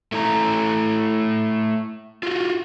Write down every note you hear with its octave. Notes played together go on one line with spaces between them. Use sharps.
A3 E4 A#5
F4 F#4